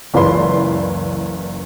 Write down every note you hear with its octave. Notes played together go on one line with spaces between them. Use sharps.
F#1 C#2 E3 D5 B5 C6